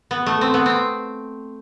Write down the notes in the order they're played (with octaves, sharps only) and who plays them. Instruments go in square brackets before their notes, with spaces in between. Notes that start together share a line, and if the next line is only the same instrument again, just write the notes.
[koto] B3
A3
C4
B3
C4